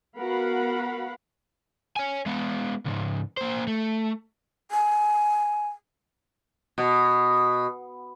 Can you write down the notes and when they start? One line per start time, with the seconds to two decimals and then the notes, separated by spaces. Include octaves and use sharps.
0.19 B3 F#4 A#4 F5 F#5 B5
1.96 C#5 G#5
2.26 G#3 B3
2.86 C#2 G#2
3.37 A#3 C5
3.67 A3
4.71 G#5
6.78 B2